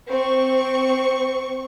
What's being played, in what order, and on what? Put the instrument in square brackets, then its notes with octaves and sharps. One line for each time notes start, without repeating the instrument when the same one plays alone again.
[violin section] C4 C#6